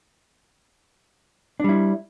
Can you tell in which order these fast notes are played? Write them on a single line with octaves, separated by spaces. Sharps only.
D4 G3 E4